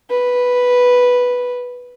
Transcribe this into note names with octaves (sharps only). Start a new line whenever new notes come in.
B4